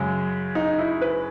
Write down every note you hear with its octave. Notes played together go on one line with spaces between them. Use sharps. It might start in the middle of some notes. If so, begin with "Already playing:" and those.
Already playing: F#2 C#3 G#3
D#4
E4
B4